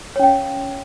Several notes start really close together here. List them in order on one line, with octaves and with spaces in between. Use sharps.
C#5 C#4 G5 F5